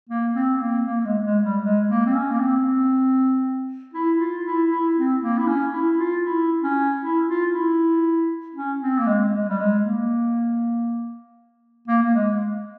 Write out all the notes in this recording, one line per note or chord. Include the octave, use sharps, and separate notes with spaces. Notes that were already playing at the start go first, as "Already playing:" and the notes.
A#3
C4
C4
A#3
A#3
A#3
G#3
G#3
G3
G#3
A#3
C4
C#4
A#3
C4
E4
F4
E4
E4
C4
A#3
E4
C#4
E4
F4
E4
C#4
E4
F4
E4
C#4
C4
A#3
G#3
G#3
G3
G#3
A#3
A#3
A#3
G#3